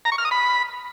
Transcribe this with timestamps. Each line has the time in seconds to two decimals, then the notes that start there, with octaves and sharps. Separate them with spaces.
0.05 A#5
0.12 C#6
0.18 F6
0.25 D#6
0.31 B5